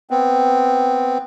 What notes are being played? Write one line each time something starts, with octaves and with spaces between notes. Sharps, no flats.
B3 C4